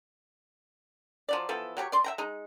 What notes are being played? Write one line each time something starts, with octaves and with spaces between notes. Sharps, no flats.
F3 F#3 D5
E3 F3 B3 A4
F#3 G4 A4 C#5
D5 C6
E5 G5 A#5
G#3 D#4